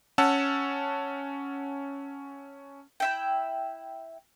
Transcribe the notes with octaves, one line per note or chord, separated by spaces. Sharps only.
C#4 F#5 A5 E6
E4 E5 G5